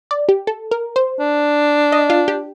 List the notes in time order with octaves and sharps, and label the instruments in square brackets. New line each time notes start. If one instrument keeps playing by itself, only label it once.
[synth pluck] D5
G4
A4
A#4
C5
[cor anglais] D4
[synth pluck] D#5
F4
G4